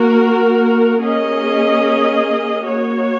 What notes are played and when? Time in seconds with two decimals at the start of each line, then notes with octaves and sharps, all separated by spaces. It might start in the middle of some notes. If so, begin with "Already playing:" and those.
Already playing: A#3 F#4 A#4
1.01 A#3 C#4 G#4 D#5
2.65 A#3 F#4 C#5